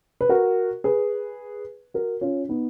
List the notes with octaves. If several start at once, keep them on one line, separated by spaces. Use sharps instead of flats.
B4
F#4 A#4
G#4 B4
F#4 A#4
C#4 F4
B3 D#4